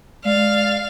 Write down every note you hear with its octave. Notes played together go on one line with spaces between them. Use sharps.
G#3 D5 F5